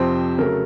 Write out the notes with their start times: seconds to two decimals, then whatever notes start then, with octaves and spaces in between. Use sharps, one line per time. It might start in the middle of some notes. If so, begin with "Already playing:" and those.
Already playing: F2 C3 F3 C4 C5
0.38 C#3 F#3 A3 A#4